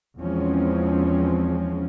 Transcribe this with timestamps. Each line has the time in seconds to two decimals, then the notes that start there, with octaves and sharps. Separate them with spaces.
0.21 E2 F3 G#3 C4 C#4